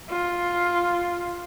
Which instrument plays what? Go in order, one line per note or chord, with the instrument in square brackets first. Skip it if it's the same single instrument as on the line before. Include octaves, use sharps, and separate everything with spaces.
[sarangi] F4